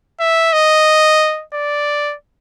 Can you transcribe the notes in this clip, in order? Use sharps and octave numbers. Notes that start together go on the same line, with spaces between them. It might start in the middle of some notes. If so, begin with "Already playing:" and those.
E5
D#5
D5